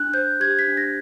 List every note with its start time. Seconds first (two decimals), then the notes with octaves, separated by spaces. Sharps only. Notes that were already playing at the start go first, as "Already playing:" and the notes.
Already playing: D4 F#6
0.14 C5 G6
0.40 G4 G#6
0.59 B6
0.68 D4
0.77 A#6